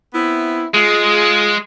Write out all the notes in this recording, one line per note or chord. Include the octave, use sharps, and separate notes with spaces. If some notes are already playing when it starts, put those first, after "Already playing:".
B3 C4 E4
G#3 F4 G#4